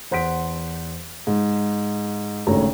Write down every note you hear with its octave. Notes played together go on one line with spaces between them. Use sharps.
E2 C5 F#5 B6 D7
G#2
G#1 D2 C#3 A3 C#5 A#5